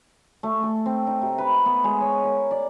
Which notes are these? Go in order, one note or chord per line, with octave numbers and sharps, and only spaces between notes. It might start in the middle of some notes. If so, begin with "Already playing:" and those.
A3
A4
C4
D#4
C3
B4
B3
G#3
C#5
A#4
D5